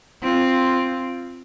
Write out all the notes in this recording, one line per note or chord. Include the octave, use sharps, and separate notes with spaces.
C4 F4